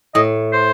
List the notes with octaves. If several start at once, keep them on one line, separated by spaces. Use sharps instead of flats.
A2 D#5
C5